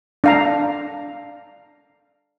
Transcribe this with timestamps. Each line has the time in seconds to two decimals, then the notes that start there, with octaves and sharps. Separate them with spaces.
0.24 D4 F5 A#5